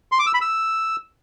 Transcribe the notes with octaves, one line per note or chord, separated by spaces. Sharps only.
C6
D6
E6
B5
E6